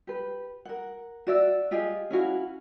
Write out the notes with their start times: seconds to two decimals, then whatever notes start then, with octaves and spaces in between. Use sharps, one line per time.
0.07 G4 B4
0.65 A#4 F#5
1.27 F#4 D5 E5
1.71 F4 G4 G#4 D#5
2.11 C#4 E4 F#4 F5